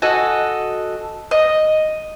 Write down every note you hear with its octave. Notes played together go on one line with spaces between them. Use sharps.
F#4 A4 D#5 G#5
D#5